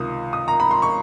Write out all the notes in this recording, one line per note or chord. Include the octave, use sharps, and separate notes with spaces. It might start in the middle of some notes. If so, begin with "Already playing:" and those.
Already playing: C#2 C3 D#3 D#6
D#6
A#5
B5
C6
C#6